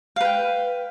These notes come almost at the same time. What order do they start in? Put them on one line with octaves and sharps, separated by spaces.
F5 B4 G5